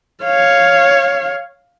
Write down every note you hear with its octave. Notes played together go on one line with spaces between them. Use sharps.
C#5 F5